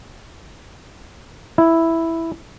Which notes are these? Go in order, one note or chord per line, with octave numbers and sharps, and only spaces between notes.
E4